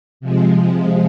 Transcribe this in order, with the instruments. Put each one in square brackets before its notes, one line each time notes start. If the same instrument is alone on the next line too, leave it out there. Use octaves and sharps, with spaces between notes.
[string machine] C3 F3 G#3